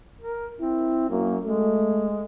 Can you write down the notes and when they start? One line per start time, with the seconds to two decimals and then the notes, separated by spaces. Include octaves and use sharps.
0.21 A#4
0.60 C4 E4
1.10 F#2 A#3
1.44 G#3 A3